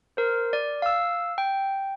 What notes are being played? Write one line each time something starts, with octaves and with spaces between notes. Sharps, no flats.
A#4 C5
D5
F5 E6
G5